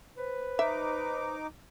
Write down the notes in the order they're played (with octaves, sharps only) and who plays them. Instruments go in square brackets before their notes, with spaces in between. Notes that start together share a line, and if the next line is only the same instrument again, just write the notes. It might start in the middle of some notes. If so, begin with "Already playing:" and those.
[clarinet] B4 [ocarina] C5
[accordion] D#4 D6 [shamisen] E5